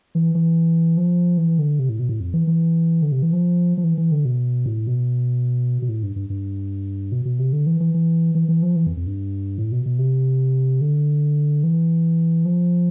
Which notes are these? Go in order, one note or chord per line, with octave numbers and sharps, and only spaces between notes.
E3
E3
F3
E3
D3
C3
A2
B2
A2
F2
E3
E3
D3
C3
E3
F3
F3
E3
E3
D3
B2
A2
B2
B2
A2
G2
G2
G2
B2
B2
C3
D3
E3
E3
E3
E3
E3
F3
E3
F2
F2
G2
A2
B2
B2
C3
D3
E3
F3